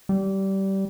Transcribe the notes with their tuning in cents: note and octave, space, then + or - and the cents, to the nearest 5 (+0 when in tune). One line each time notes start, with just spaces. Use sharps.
G3 -20